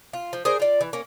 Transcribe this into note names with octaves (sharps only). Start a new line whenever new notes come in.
F4
F3
G#4 A#4 C5 D5
F4 D5
E3
A#3 C#4